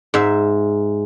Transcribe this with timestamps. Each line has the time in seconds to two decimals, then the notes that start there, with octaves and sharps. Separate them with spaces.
0.14 G#2 E5